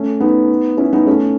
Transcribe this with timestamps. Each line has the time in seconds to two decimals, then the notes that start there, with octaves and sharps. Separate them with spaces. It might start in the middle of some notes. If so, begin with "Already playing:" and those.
Already playing: A3 C#4
0.20 B3 D#4
0.77 C#4 E4
0.93 B3 D#4
1.06 A3 C#4